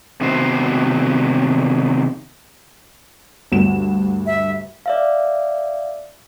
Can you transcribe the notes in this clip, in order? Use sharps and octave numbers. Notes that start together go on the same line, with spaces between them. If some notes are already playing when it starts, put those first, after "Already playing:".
C3 D#3 B3 F#4 C5
D2 G2 E7
E5
D5 E5 F5